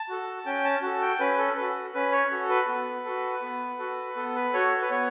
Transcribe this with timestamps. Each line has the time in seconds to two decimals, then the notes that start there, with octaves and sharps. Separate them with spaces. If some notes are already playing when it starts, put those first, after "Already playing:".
Already playing: A5
0.09 F#4 A4
0.46 C#4 G5
0.64 A5
0.82 F#4 A4 A5
1.01 G5
1.19 C#4 B4
1.38 A4
1.56 F#4 A4 B4
1.94 C#4 B4
2.12 C#5
2.31 F#4 A4
2.49 B4
2.68 B3
3.05 F#4 A4
3.42 B3
3.79 F#4 A4
4.16 B3 A4
4.35 B4
4.53 F#4 A4 C#5
4.82 B4
4.90 B3 C#5